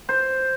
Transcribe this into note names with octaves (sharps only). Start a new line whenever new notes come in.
C5